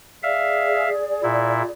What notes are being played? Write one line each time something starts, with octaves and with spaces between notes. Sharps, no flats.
G#4 D5 E5 F5
A#2 E4